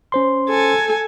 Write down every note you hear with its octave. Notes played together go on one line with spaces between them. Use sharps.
C#4 C5 C6
A4 G#5